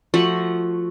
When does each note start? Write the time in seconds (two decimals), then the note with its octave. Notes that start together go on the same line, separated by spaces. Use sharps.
0.14 F3 A3 F#4 F#5